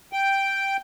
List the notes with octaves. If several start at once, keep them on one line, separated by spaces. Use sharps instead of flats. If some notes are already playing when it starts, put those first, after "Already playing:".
G5